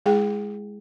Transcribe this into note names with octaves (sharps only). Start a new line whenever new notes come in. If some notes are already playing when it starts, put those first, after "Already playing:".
G#3 E4 G#4 G5